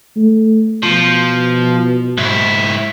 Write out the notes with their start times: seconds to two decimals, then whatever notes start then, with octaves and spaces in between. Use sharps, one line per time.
0.16 A3
0.83 B2 F3
2.17 G#2 E4